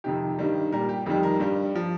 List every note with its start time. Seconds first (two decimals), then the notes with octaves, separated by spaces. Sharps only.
0.04 F2 C3 D#3 G4
0.39 G2 D#3 G3
0.72 A#2 G3 A#4
0.89 G4
1.06 F2 D#3 G3 G4
1.23 A#4
1.40 G2 G3
1.75 F3